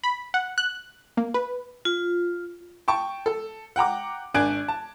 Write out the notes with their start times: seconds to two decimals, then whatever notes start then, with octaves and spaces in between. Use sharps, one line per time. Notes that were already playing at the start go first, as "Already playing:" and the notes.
0.04 B5
0.34 F#5
0.58 F#6
1.17 A#3
1.34 B4
1.85 F4
2.88 G5 A5 C#6
3.26 A4
3.76 F#5 G5 A#5 D6
4.34 G#1 D4 G#5 F#6 G#6 D7
4.68 A5